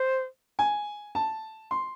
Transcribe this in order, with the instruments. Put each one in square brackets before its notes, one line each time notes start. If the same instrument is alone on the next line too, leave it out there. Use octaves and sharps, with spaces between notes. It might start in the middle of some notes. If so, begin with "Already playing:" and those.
Already playing: [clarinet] C5
[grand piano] G#5
A5
C6